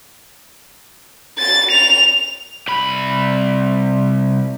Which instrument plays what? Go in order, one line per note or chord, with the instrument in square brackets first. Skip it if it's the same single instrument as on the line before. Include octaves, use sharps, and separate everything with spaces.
[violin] A6
F7
[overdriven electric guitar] C2 B5